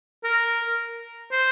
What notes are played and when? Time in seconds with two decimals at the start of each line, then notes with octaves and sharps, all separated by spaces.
0.24 A#4
1.32 C5